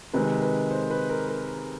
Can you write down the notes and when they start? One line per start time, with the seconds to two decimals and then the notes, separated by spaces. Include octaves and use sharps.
0.13 C3 D#3 G#3 B4
0.42 B4
0.71 C5
0.91 B4
1.10 A#4
1.29 A#4